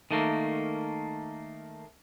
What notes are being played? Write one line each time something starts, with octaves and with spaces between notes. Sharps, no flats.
D#3 A3 A#3